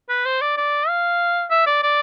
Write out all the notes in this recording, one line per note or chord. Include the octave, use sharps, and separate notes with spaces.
B4
C5
D5
D5
F5
E5
D5
D5